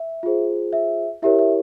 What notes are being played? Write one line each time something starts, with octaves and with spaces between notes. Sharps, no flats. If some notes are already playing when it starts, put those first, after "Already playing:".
Already playing: E5
F4 G#4 C5
E5
E4 G4 A#4 C#5 E5
E5